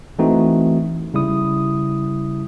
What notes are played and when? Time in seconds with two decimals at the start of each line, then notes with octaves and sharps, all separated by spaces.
0.19 E3 A3 C4 D#4 F#4
1.14 C#3 G3 E4 D#6